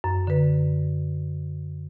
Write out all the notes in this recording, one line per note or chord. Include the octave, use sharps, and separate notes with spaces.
F#2
D3 B4